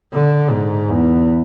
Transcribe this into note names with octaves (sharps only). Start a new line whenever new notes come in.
D3
G#2
E2